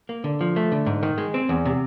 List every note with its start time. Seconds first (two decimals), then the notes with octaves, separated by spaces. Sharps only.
0.09 A#3
0.24 D3
0.41 F3
0.56 A3
0.72 D3
0.86 G#2
1.03 D#3
1.18 G#3
1.34 C4
1.49 E2
1.65 C3